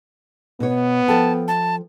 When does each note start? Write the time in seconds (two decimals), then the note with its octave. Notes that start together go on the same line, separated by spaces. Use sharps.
0.60 B2 B3 C#5
1.08 F3 A4 G5 A5
1.48 A5